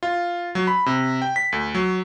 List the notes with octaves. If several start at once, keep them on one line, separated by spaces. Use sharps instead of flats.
F4
F#3
B5
C3
G5
B6
D2
F#3